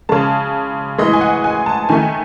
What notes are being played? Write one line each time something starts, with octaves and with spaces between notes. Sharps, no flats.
C#3 G#3 A5
A2 E3 G#3 D#5
G#5
F#5
G#5
A5
D#3 A3 G#5